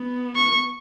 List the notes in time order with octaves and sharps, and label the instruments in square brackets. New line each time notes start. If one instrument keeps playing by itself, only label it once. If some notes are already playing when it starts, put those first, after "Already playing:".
Already playing: [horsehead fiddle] B3
[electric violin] C#6